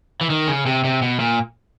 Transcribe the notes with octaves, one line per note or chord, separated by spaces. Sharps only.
E3
D#3
C#3
C3
C3
B2
A#2